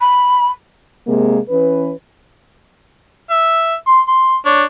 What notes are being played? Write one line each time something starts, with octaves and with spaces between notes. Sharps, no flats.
B5
C3 G#3 A#3
E3 C#4 B4
E5
C6
C6
D4 C#5